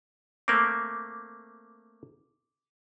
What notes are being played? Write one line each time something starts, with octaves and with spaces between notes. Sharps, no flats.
A3 A#3 C4 D6